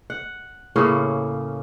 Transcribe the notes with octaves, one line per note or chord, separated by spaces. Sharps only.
F#5
A2 C#3 A#3 C#4